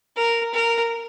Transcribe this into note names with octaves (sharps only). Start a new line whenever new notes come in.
A#4
A#4